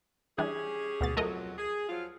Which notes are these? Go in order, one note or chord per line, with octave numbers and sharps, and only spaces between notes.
E3 G3 C#4 D4 G4 G#4
D2 B2 A6
F2 F#3 A3 A#4 D#5
G#4
F3 F#3 F4